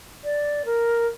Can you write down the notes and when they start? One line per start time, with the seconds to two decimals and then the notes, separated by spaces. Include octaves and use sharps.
0.24 D5
0.66 A#4